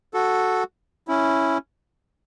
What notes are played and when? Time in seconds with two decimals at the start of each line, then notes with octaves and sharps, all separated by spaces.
0.14 F#4 A4
1.08 C#4 E4